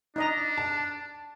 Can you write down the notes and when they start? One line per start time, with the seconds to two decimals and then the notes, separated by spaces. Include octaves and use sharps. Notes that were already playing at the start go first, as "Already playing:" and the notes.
0.16 D4 D#4 D#5 A#5
0.57 A5